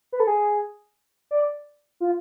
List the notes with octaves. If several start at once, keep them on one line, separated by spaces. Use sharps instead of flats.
B4
A4
G#4
D5
F4